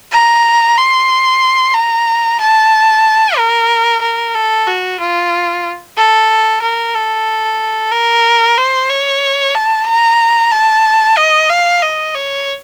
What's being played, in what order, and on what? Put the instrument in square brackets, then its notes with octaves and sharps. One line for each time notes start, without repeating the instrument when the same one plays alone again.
[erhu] A#5
C6
A#5
A5
A#4
A#4
A4
F#4
F4
A4
A#4
A4
A#4
C5
C#5
A5
A#5
A5
D#5
F5
D#5
C#5